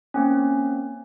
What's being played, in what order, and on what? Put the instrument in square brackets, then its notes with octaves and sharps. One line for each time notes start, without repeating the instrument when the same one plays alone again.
[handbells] A#3 C4 C#4